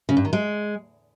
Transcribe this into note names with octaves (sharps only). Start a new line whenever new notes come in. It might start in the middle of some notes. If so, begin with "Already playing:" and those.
C#3
G2
D#3
G#3